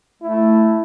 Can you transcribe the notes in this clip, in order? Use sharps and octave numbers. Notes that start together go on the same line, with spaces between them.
A3 E4